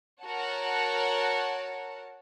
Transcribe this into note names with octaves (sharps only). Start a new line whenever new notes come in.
F#4 A#4 C#5 F#5 A5